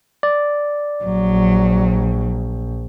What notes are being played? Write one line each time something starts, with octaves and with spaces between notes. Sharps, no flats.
D5
A#1 F#3